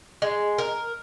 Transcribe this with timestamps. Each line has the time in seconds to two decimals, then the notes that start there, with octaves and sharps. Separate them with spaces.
0.22 G#3
0.58 A#4